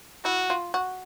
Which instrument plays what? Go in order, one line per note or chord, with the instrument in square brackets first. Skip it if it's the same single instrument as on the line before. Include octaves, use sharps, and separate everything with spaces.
[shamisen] E4 [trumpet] F#4
[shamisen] F4
F#4